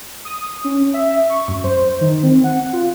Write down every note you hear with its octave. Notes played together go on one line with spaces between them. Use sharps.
D#6
C#4
E5
C#6
F#2
C5
D#3
C4
F#5
F4